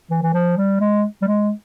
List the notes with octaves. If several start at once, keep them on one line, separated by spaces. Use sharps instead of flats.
E3
E3
F3
G3
G#3
G3
G#3